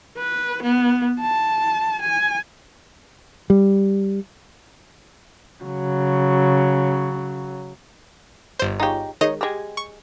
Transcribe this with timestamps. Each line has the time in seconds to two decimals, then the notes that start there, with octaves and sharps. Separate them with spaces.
0.18 B4
0.63 B3
1.20 A5
2.02 G#5
3.50 G3
5.64 C#3 F#3
8.59 G1 C5
8.80 D#4 F4 G4 G#4 C#5
9.21 D#3 G#3 C#5 D#5
9.41 G3 G#3 G4 G#6
9.77 C#6